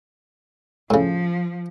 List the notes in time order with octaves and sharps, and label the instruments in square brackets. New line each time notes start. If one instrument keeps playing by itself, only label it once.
[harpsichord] A2 C#3 [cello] F3